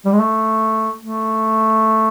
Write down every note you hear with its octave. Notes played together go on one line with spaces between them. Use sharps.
G3
G#3
A3
A3